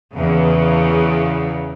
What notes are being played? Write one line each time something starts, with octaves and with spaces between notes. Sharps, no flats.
E2 C#3